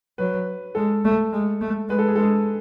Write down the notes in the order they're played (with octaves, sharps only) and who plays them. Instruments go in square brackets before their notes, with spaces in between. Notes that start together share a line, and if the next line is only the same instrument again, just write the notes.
[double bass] F#3 [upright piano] B4
[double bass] G#3 [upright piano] A4
[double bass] A3
G#3
A3
[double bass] G#3 [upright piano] B4
[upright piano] A4
G#4
[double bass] G#3 [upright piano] A4
[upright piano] G#4